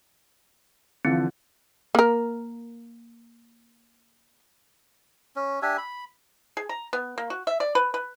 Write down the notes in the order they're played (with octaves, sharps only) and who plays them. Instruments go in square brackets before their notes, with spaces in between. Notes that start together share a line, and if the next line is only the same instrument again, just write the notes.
[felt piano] D3 E3 F3 [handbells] C4
[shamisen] A#3 A#4
[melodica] C#4
D4 G4 E5 G#5
B5
[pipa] G#4
A#5
B3
A#3
F#4
E5
D5
B4
B4